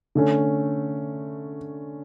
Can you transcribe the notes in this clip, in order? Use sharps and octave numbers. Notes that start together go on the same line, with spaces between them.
D3 A3 C#4